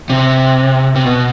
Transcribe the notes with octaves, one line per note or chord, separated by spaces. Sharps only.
C3
C3
B2